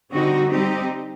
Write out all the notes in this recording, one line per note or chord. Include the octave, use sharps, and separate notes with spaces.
D3 G3 C4 D#4 F#4
G3 C4 D#4 G4